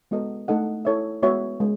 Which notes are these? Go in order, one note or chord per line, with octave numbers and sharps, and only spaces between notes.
G#3 B3 F#4 A4 D#5
A3 D#4 A4 D#5 F#5
E4 A4 C#5 E5
G#3 B3 F#4 C#5 E5
G#3